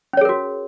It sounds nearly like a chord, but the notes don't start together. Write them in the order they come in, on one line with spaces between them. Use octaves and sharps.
C#4 C#5 G#4 A#4 F#4